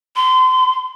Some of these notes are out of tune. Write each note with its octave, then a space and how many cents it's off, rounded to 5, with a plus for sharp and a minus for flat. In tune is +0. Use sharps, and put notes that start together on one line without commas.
C6 -30